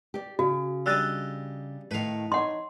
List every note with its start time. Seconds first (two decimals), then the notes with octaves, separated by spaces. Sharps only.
0.14 G4 D5
0.39 C#3 F#4
0.86 G3 D4 D#5 E6 F#6 A6
1.91 A2 D#3 B4 F5
2.32 D#4 C#5 F#5 C6